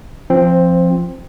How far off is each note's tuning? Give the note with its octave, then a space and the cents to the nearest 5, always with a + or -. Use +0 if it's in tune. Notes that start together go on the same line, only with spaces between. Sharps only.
F3 -10 C4 +10